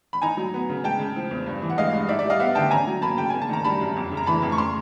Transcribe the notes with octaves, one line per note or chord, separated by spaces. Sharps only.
B5
D#4 G#5 A#5
F#3
B3
C#3
G#3 G5 A5
C#3
F3
E2
G2
E3
F#5
G#3 D#5 F5
G2
D#4 D5 E5
D5 E5
G3 D#5 F5
B3 E5 F#5
D3 G5 A5
C#4 G#5 A#5
F#3
A#3 A5 B5
C#3 G5
A#3 G#5
A5
D#3 A#5
G3 A5 B5
F#2
F2
C#3
A#5
E3 A5 B5
F2
C#6
C#3 A#5 C6